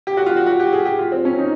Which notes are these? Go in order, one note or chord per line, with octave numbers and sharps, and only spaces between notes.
G4
F#4
F4
F#4
F#4
G4
G#4
G4
F4
C4
C#4
D#4